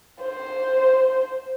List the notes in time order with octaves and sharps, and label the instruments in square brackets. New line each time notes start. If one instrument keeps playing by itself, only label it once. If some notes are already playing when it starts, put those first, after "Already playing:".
[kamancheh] C5